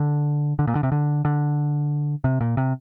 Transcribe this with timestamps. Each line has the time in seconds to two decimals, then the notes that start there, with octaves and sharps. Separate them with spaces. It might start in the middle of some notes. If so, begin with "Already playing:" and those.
Already playing: D3
0.59 D3
0.67 A#2
0.75 D3
0.83 C3
0.92 D3
1.25 D3
2.24 C3
2.41 A#2
2.57 C3